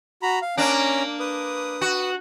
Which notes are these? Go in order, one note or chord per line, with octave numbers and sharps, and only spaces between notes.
F#4 A#5 B5
F5
A#3 C#4 D4 A#5
B4 D#6
F#4